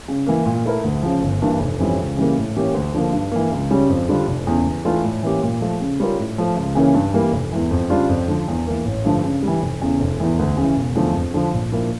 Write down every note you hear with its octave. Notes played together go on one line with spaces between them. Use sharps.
C#3
E3 A#3
A#2
A3 E4 A#4
D2
C#3 F3
G1
G2 E3 A#3
F1
F2 E3 G3 C#4
C#2
C#3 E3 G3 A#3
A2
E3 A#3 C#4 G4
D2
D3 F3 A#3
G2
E3 A#3
C#2
C#3 G3 C#4
F2
D3 G3 D4 F4
F1
E2 C#3
E2
E3 A3 D4 F4
A2
E3 A#3 C#4 G4
A#2
F3 A3
C#3
G3 C#4 F4 A#4
A2
F3 A3
C#2
C#3 E3 A#3 C#4
G2
E3 G3 A#3
F1
E2 E3
F2
C#3 G3 D4 F4
F2
D3 F3
E2
E3 A#3
A1
G2 D3 F3 A3
C#3
G3
E3
F1
E2 C#3
F1
E2 E3
D2
C#3 E3
E1
E2 D3 F3 A3
F2
D3 F3
A#1
A#2 F3 A#3 E4